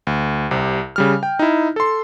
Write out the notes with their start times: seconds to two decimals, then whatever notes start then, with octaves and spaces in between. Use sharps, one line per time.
0.07 D2
0.51 C2 C3
0.96 C#3 G3 F6
1.23 G5
1.39 D#4 E4
1.76 A4 C6